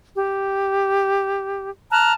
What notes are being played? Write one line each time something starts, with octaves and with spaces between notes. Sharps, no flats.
G4
A5 A#5 F6 F#6